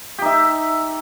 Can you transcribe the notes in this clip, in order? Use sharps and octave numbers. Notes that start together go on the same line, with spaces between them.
D#4 G4 E5